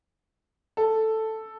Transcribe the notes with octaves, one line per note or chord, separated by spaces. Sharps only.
A4